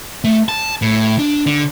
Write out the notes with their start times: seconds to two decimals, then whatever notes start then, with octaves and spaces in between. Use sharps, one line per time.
0.24 A3
0.49 A5
0.82 A2
1.19 D4
1.46 D3